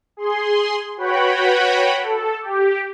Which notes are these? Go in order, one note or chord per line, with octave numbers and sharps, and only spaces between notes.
G#4 C6
F#4 B4 C#5 F#5 G5 B5
A4
G4